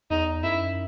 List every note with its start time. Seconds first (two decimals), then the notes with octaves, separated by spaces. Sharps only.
0.11 E2 D#4
0.43 F#2 E4